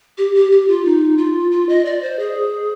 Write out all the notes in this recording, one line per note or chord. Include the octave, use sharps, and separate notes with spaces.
G4
G4
G4
F4
D#4
F4
F4
D#5
D5
C5
G#4